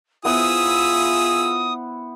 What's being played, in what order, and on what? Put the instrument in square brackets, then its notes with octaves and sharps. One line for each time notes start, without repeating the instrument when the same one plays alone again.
[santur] B3 E4 C5 [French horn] F4 [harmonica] G#4 E5 E6 [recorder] D#6